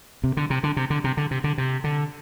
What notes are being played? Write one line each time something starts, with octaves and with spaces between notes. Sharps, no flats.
C3
D3
C3
D3
C3
D3
C3
D3
C3
D3
C3
D3